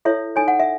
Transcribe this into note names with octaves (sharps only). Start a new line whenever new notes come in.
E4 A4 C#5 E5
D#4 A4 C#5 G#5
F#5
E5